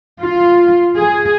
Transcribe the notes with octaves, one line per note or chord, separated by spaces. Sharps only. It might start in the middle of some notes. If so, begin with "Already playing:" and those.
F4
G#4